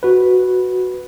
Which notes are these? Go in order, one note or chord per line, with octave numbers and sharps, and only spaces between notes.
F#4 B4